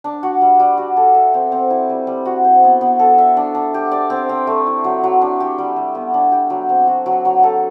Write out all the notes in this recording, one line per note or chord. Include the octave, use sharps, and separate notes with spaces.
D4
F#4
G3
G3
F#4
A4
E5
C4
C4
E4
G3
G3
F#4
C5
B3
B3
A4
E5
D4
D4
G4
D5
C4
C4
A3
E4
F#3
F#3
D4
G4
G3
G3
B3
D4
G4
F#3
C4
F#4
F#3
F#3
A4